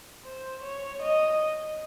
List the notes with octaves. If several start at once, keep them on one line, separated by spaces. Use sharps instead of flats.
C5
C#5
D#5